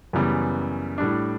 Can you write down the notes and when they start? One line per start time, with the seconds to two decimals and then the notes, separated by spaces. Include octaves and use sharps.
0.13 F#2 C#3 E3 G3 B3
0.98 A2 G3 D4